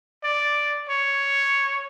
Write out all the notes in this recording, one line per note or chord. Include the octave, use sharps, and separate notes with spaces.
D5
C#5